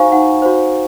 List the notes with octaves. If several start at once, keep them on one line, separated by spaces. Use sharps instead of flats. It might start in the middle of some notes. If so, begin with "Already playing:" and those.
Already playing: D#4 F#4 C5 F5 G#5 A#5 C#6
D#4 F#5
F#4 C5